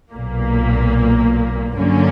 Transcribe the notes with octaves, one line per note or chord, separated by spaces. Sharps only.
B1 A#2 A#3
G2 D3 F#3 A#3 C#4